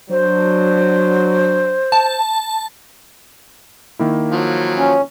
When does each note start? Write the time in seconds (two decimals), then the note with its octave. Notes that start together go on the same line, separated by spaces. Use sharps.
0.10 F#3 D4 C5
1.92 A5
3.99 D#3 A#3 E4
4.32 F3 F#3
4.77 C#4